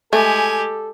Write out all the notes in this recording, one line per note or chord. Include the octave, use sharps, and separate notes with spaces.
G#3 A3 G4 A4 G#5